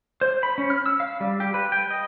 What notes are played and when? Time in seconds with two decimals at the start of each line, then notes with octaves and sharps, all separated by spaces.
0.21 C5
0.43 B5
0.58 C#4
0.70 F6
0.86 E6
1.00 F5
1.20 G3
1.40 G4
1.54 B4
1.72 G5
1.90 D#5